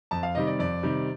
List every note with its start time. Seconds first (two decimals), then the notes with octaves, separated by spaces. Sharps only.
0.11 F2 A5
0.23 F5
0.35 C3 D#3 G3 D#5
0.47 D5
0.59 F2 D5
0.83 C3 D#3 G3